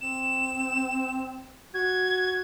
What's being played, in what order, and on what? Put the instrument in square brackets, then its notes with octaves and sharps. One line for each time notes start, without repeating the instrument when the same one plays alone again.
[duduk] C4 [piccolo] E7
[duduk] F#4 [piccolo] G#6